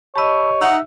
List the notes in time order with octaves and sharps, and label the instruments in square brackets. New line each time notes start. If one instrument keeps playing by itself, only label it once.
[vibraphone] G4 D#5 [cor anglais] C#5 [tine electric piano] A5 B5 E6
[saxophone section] D#4 F#5 [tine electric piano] E5 E6